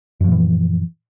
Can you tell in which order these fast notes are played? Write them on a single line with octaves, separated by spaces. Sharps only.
F#2 F3 A#2 E3